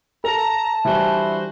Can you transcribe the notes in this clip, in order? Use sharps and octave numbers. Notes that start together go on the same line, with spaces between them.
A4 A5 A#5
D3 E3 G3 E4 F#4 C5